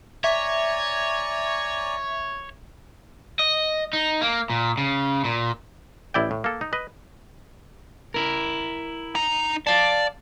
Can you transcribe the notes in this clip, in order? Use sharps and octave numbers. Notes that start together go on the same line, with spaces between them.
C#5 D5 E5 G#5 A#5
D#5
D#4
A#3
A#2
C#3
A#2
A1 E4 D5 G5
A2
A#3 A4
D#4
B4 D#5
E4 A#4
D#4 A#5
D5 F5 A5